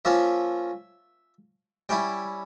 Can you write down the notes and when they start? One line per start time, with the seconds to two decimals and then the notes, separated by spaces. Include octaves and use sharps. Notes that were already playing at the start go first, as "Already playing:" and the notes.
0.05 F3 A#3 C#4 F4 E5
1.89 G3 C#4 E4 G5